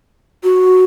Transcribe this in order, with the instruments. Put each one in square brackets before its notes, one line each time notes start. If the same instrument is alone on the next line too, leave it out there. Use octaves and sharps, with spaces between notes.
[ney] F#4